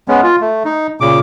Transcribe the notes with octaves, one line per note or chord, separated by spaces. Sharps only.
G#3 B3 C#4
F4
A3
D#4
A#2 C#3 D6